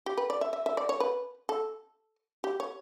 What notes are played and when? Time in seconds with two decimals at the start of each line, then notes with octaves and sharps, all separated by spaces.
0.06 G4
0.18 B4
0.30 D5
0.41 E5
0.53 E5
0.66 E5
0.77 D5
0.89 C#5
1.00 B4
1.49 A4
2.44 G4
2.60 C#5